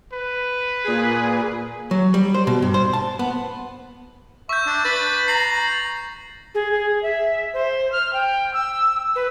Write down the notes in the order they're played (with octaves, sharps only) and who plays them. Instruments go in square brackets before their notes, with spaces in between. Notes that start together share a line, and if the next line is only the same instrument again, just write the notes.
[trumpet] B4
[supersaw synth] A#2 G#4
[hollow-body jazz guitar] F#3
G3
C5
B2
G2
C5
A5
B3
[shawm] E5 [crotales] C#6 G6
[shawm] D4
[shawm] B4 [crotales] A6
[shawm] A#5 [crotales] C7 F#7
[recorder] G#4
G#4
E5
C5
F6
G5
E6
B4